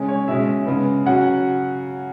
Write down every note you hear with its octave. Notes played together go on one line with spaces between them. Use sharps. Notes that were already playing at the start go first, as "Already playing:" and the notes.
Already playing: C#3 G#3 C#4
C#5
B2 G#3 C#4 E5
C#3 G#3 B3
C#3 F#3 C#4 F#5